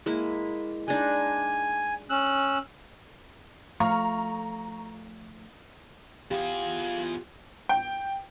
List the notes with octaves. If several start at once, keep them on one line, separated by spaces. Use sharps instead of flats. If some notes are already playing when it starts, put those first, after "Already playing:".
G#3 A#3 E4
G#3 D4 D#4 G#5
C#4 E6 F#6
F3 A3 F5 A#5 C#6
E2 F4 G4 G#4 F5
G5